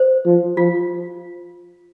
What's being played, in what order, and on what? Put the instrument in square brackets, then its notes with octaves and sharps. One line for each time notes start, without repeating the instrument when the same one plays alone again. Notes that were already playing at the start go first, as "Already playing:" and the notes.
Already playing: [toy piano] C5
[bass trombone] F3
[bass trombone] F3 [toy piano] F4